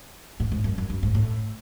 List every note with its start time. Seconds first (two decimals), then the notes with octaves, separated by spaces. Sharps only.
0.40 A2
0.52 G#2
0.64 F#2
0.78 F#2
0.90 F#2
1.03 G#2
1.15 A2